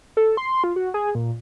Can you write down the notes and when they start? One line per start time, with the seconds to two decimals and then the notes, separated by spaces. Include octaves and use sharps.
0.17 A4
0.37 C6
0.64 F4
0.76 F#4
0.94 G#4
1.15 A#2